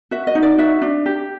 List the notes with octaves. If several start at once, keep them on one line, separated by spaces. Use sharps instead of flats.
F#4 E5
D#5
D#4
D5
F#4 E5
D4
G4